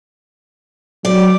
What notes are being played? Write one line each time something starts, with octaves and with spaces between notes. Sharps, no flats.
F#3 D5